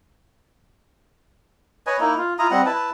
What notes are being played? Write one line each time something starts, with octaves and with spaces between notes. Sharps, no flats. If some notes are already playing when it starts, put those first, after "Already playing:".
B4 C#5 D#5 G#5
A#3 D#4 E4
F4
E4 F4 A#5 D#6
G3 C4 D#5 F#5
E4 B4 A5